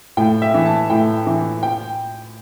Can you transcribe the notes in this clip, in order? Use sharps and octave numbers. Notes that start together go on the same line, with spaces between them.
A2 G5
E5
E3
A5
A2 G5
E3
G5